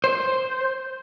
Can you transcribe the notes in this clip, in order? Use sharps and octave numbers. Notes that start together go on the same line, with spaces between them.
C5